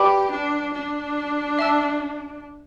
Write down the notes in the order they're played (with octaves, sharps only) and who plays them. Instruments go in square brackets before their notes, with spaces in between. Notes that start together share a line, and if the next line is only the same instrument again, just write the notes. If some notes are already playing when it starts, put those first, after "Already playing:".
Already playing: [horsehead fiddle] G4 [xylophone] B4 D5 G5 B5 D6
[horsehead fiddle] D4
D4
[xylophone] E5 A5 E6